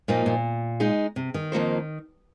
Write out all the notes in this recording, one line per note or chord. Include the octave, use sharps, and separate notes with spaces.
A#2 F3 A#3 D#4
A#2
G#3 D#4 G#4
C3
D#3
F2 F3 A#3 D#4 C5